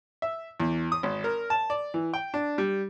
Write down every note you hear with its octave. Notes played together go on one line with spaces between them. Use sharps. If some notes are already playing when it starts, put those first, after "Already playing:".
E5
E2
D#6
G#1
A#4
A5
D5
E3
G5
D4
G3